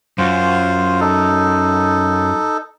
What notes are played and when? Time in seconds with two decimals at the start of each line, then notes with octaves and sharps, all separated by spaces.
0.18 F#2 F4 C5
1.01 D#4 A4